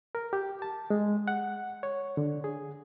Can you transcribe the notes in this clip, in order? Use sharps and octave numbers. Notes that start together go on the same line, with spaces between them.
A#4
G4
A5
G#3
F#5
C#5
D3
G#4